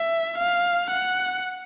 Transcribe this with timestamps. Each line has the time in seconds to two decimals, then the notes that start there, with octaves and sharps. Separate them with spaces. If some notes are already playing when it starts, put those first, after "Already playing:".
Already playing: E5
0.38 F5
0.91 F#5